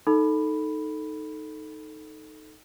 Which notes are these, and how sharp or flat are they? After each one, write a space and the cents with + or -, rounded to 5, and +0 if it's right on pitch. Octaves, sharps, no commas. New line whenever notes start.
D#4 +0 A4 +0 B5 +0